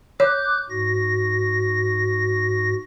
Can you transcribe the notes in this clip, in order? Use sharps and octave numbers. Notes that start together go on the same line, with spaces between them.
C#5 D6 F#6 G6
G#2 F#4 A#6